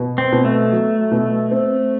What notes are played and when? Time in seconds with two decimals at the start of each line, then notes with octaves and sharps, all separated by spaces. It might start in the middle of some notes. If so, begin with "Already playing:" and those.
Already playing: B2
0.18 C4
0.32 B2
0.45 A3
0.72 F#3
1.11 B2
1.51 C4